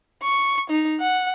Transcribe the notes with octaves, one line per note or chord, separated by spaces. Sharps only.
C#6
D#4
F#5